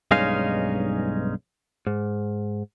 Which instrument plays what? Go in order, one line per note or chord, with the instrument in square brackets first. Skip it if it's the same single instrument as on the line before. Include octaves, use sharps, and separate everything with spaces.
[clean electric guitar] B1 G2 G#3 C#4 D#4 F5
G#2